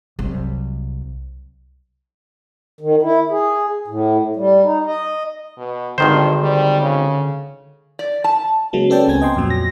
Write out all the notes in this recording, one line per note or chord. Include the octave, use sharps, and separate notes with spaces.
C2 F#3
D#3
E4
G#4
A2
G3
D#4
D#5
B2
G#1 G2 D3 D#3 C5
G3
C#3
D5
A5
C#3 F#3 G#3 A#3
B3 C#4 A4 D5 G5 A5
C#2 B3 C4 G#5 G#6
D#5 G5 C6
F2 A#2 F#3
A#6